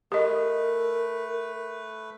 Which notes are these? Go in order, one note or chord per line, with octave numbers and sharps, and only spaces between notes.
A3 G4 A#4 B4 D#5